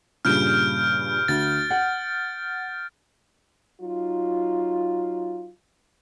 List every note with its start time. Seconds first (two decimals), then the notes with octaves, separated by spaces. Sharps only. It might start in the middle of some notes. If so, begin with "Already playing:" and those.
0.25 G2 A#2 C#3 F6 G6 D7
1.28 D2 A6
1.70 F#5
3.81 F#3 D#4 F4